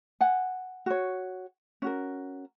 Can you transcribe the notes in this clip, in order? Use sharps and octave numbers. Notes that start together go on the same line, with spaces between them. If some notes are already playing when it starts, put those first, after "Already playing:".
F#5 G#5
F#4 C#5
C#4 F#4 A#4